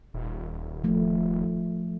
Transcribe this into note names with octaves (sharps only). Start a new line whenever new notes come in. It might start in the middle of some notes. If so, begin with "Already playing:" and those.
D#1
F3 A3